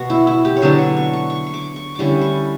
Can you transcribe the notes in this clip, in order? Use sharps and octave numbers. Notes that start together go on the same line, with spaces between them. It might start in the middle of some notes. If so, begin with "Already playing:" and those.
Already playing: B2 F#4
E4
E4
G4
C#5
D3 F#3 B3 D4 D5
C#6
C#6
C#6
C#6
C#6
D6
C#6
D3 G3 C#4 E4 C#6 D6
C#6